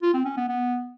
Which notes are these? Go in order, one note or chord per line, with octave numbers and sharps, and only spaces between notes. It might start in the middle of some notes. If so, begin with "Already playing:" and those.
F4
C4
C#4
B3
B3